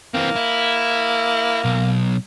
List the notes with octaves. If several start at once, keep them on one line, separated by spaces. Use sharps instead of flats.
E3 A#3 C4
E4
B1